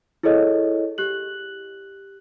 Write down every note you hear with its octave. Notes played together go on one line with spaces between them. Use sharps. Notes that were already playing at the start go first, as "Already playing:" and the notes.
E4 G#4 A4 C#5 D#5
G4 F#6 F#7